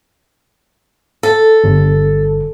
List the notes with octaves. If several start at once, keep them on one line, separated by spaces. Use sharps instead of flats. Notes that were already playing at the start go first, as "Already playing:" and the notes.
A4
G1